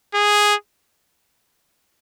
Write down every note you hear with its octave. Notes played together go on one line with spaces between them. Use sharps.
G#4